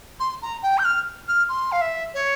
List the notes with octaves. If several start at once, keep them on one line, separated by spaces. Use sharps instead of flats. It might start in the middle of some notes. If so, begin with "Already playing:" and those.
C6
A#5
G5
G6
F6
F6
C6
F5
E5
C#5